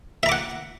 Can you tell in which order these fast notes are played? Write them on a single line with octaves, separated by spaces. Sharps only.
E5 A#5 D6 F#5